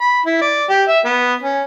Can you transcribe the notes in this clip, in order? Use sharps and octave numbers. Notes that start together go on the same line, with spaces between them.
B5
E4
D5
G4
E5
B3
C#4